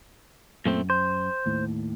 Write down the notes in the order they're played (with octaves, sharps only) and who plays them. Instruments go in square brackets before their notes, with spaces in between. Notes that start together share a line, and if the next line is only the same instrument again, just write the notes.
[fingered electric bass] F#2 [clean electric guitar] A#2 A3 C4
[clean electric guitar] C5
[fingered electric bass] D#2 A2